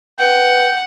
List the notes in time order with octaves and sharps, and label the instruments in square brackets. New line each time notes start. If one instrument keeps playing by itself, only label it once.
[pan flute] B4 [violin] F#5 [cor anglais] G5